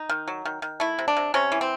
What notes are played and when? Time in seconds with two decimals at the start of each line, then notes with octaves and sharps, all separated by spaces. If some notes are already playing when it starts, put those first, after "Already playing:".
Already playing: D#4
0.09 D#3
0.28 F#3
0.45 D#3
0.62 D#3
0.80 A3 E4
0.99 C3
1.08 D4
1.17 C3
1.34 C3 C#4
1.52 E3
1.61 C4